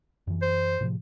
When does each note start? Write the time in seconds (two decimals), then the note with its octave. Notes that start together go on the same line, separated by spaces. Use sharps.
0.27 F#2 E3
0.42 C5
0.81 A2 C3 F3